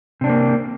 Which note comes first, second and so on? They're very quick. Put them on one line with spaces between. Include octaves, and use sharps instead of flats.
C3 D4 C4 A#3